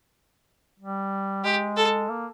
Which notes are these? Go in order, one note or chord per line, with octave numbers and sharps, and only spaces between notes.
G3
G#3 G4
A4
A#3